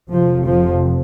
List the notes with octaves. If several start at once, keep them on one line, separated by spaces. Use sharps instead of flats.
F1 F2 C3 F3
F3